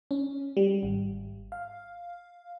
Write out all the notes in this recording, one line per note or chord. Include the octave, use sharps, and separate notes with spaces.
C#4
G3
G#1
F5